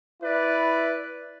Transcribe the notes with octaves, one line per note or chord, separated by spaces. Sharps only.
E4 B4 D5